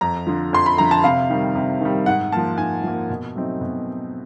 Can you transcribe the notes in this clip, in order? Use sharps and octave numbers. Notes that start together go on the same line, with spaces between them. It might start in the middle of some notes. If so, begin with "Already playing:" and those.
F2 A#5
D3 F3
F2 C6
B5
D3 F3 A#5
A5
C3 F5
D#3 G3
C3
D#3 G3
G#2 F#5
F3 A#3 A5
G#2 G#5
F3 A#3
B2
F#3 A3 C4 D#4
B2